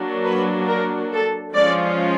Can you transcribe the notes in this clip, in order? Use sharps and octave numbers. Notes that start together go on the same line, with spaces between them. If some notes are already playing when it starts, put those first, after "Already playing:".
Already playing: F#3 A#3 D4
B4
A#4
A4
F3 G#3 C#4 F4 D5